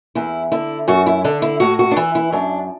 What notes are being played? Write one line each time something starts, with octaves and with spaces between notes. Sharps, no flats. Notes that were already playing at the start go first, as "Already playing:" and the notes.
E2 E4
D3 E4
F#2 F#4
E4
D3 D4
E4
A2 F#4
F#4
D4
E3 E4
E4
F#2 D4